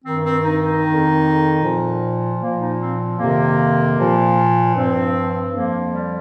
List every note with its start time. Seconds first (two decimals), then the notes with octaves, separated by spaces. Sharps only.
0.05 G2 D#3 C4
0.26 C4
0.45 D#4
0.64 D#4
0.84 F2 D#3
1.62 A#2 F3
2.40 A#2 F3 A#3
2.60 D#4
2.80 C4
3.19 F2 C3 D#3 A#3
3.98 A#2 F3
4.75 G2 F3 C4
5.54 F2 F3 A#3
5.93 G3